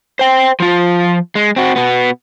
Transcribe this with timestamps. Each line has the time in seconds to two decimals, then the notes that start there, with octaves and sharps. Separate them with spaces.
0.19 C5 G5
0.60 F3 F4
1.35 G#3
1.56 C4 F#4
1.76 B2 B3